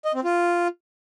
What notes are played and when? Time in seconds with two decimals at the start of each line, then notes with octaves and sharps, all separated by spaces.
0.05 D#5
0.15 C4
0.24 F4